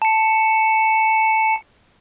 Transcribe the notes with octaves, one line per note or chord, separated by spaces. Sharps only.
A5 C#7